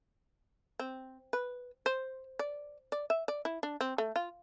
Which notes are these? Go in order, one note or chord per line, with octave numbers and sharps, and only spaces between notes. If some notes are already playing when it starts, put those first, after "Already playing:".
C4
B4
C5
D5
D5
E5
D5
E4
D4
C4
A3
F4